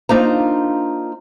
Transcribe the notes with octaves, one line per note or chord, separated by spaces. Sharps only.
A#3 D4 D#4 F4 C5 A#5